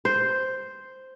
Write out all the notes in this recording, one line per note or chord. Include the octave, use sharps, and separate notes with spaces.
C5